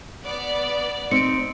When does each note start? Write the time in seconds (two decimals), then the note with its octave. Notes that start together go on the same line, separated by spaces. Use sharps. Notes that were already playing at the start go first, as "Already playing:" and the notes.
0.23 B3 D5
1.11 C4 D#4 C#7 D7